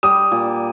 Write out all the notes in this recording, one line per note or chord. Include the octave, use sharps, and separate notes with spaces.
G3 D#6
A#2